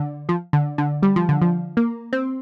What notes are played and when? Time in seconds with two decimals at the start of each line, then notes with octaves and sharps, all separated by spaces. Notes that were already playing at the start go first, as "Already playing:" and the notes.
Already playing: D3
0.29 F3
0.53 D3
0.78 D3
1.03 G3
1.16 F3
1.29 D3
1.42 F3
1.77 A#3
2.13 C4